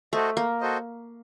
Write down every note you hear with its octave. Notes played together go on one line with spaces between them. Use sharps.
A3 F#4 A4 C5 D#5
A#3
F#4 A4 C5 D#5